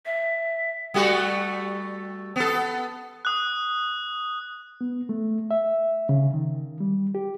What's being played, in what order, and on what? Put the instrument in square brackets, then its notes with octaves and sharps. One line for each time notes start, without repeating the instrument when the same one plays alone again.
[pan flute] E5
[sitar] G3 A3 F#4
B3 A4
[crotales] D#6 F#6
[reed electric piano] B3
A3
E5
C#3
D#3
G3
G4